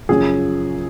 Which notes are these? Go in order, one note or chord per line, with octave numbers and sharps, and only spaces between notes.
F#2 C#3 F3 G#4